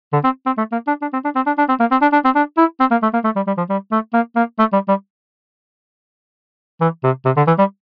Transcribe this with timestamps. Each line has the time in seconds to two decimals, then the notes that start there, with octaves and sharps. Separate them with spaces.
0.13 D3
0.24 C4
0.46 C4
0.57 A3
0.72 A#3
0.87 D4
1.02 D4
1.13 C4
1.24 D4
1.35 C4
1.46 D4
1.58 D4
1.69 C4
1.80 A#3
1.91 C4
2.02 D4
2.13 D4
2.25 C4
2.35 D4
2.57 E4
2.80 C4
2.91 A#3
3.02 A3
3.13 A#3
3.24 A3
3.36 G3
3.47 G3
3.57 F3
3.70 G3
3.92 A3
4.13 A#3
4.36 A#3
4.59 A3
4.73 G3
4.88 G3
6.81 E3
7.04 C3
7.25 C3
7.37 D3
7.47 E3
7.59 G3